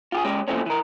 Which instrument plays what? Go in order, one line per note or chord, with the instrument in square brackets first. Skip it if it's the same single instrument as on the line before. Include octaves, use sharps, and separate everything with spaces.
[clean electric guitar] F4 G4 G#4
G#3 C#4 G4
A#2 E3 F3 A3 C4 C#4
E3 A#4